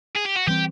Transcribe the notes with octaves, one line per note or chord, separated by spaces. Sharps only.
G#4
G4
F#4
E3 G3 C4 G4